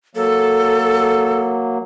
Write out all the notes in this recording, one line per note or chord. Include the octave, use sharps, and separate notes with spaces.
F#3 A#3 A4